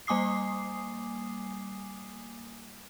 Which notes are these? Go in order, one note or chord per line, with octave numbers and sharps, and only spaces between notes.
G3 A#3 G#5 D6 D#6 C7